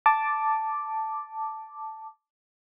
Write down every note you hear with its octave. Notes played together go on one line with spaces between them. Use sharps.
A5 D6